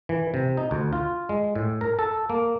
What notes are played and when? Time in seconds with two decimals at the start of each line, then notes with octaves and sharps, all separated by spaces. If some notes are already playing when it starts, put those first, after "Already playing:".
0.09 E3
0.34 C3
0.57 D#4
0.71 D2
0.93 F4
1.29 G#3
1.55 A2
1.81 A#4
1.99 A4
2.30 A#3